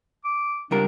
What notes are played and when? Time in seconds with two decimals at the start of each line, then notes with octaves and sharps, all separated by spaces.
0.25 D6
0.71 C#2 G3 D4 A#4